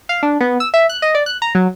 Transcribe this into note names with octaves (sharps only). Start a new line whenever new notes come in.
F5
D4
B3
E6
E5
F#6
D#5
D5
F#6
A#5
F#3